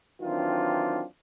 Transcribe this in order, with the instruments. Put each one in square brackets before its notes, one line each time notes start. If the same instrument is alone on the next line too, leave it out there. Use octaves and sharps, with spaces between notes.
[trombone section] D#3 E3 F#3 C4 D4 F4